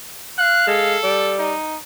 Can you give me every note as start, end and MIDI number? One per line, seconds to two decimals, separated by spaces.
0.39 1.01 77
0.39 0.67 90
0.68 0.98 56
0.68 1.40 69
1.04 1.52 55
1.39 1.77 63